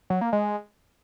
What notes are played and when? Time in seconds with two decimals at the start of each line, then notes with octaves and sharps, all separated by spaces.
0.10 F#3
0.21 A#3
0.33 G#3